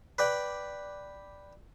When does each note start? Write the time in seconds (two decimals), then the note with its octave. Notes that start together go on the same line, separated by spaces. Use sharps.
0.18 B4 D5 G5